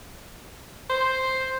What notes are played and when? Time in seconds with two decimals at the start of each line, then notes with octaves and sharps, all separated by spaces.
0.90 C5